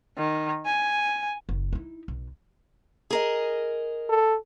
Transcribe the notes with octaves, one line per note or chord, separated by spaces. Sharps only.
D#3
G#5
F#1
D#4 E4
B1
G#4 A#4 D#5
A4